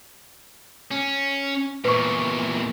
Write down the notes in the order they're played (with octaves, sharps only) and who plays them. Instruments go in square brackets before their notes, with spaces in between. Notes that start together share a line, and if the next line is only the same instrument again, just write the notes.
[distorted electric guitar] C#4
[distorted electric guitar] E2 A#2 [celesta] B4 C#6